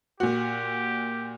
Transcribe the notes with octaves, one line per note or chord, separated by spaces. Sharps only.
A#2 F#4 G4